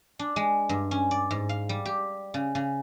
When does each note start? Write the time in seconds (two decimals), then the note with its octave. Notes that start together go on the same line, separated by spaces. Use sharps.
0.19 D4
0.36 G#3
0.69 G2
0.91 C#4
1.11 D5
1.31 G#2
1.49 F5
1.69 G3
1.86 G4
2.34 C#3
2.55 C#3